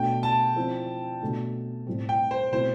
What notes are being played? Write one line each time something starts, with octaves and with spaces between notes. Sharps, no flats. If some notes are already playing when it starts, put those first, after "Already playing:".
Already playing: B2 A3 D4 G5
A5
F3 C4 E4
B2 A3 D4
A2 G3 C4
G5
C5
B2 A3 C4 E4 C5